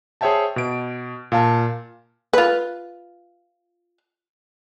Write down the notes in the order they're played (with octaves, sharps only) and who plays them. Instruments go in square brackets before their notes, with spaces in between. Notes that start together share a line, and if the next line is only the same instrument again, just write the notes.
[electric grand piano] G#4 C5 C#5 E5 G5 A5
B2 D7
A#2 F5 A5
[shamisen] F4 B4